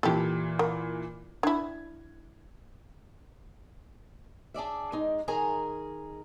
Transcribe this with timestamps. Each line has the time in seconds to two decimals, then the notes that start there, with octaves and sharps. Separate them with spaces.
0.03 A#2 E3 G4 A4
0.59 A#3
1.43 D4 E4 G#6
4.54 D4 G#4 D5 E5
4.92 G#3 D#4
5.28 D#3 G#4 A#4 G#5 A#5